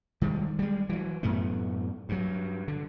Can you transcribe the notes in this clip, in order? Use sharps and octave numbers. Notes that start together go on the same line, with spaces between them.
D#3 G3 G#3
G3 G#3
E3 F#3
F#2 A2 A3 B3
G2 F#3
D3